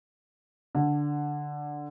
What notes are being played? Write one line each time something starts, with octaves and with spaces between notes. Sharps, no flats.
D3